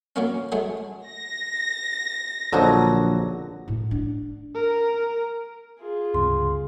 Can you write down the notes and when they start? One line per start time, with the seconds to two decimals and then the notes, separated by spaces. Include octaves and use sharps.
0.16 F#3 A#3 C#4
0.52 F#3 G#3 A3
1.07 A#6
2.53 A#1 D3 F3 F#3 D#4
3.68 A2
3.91 D4
4.55 A#4
5.80 F4 G#4
6.14 C#2 G2 C3 C6